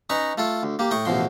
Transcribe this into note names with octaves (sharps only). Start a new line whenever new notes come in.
C#4 D#4 B4 D#5 A#5 C#6
A3 F4 A4
D2
A#3 G4
A2 G5 C#6 D#6
A1 E2 B2 F3 C6